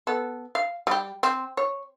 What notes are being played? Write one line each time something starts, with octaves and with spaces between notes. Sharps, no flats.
B3 A4
F5
G3 G4
C4
C#5